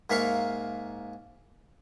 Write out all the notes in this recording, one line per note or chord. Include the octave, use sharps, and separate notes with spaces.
G#2 A#3 E5 F5 C#6